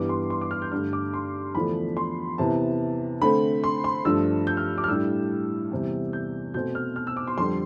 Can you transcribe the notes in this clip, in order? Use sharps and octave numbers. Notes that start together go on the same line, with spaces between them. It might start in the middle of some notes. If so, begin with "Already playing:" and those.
Already playing: G2 E3 G3 B3 D6
C6
C6
D6
F6
G6
G2 D3 A3 F6
D6
C6
E2 D3 F3 A3 D4 B5
C6
E2 C3 E3 B3 A5
D3 A3 C4 B5
C6
C6
G2 F3 A3 D4 E6
G6
F6
D6
F6
A2 G3 D4 E6
E2 C3 G3
G6
B2 A3 C4 G6
F6
F6
E6
D6
C6
F2 D3 G3 C6